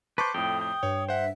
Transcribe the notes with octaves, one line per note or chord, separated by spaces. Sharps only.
B4 C5 A5 C#6 D6
F2 A2 G5 D#6
G5
G2 C#5
C5 E5 F#5